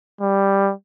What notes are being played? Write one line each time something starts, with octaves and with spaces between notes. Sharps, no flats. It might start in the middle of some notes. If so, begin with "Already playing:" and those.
G3